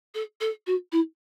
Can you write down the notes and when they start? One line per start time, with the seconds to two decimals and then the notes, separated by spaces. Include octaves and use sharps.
0.15 A4
0.41 A4
0.67 F#4
0.92 E4